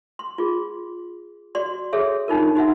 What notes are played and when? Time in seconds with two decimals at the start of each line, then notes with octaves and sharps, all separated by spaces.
0.19 C6
0.38 F4 G#4
1.55 F#4 D5 C6
1.93 G#4 A4 C#5 E5
2.28 D4 D#4 F4 A#4
2.55 D#4 F#4 E5 F#5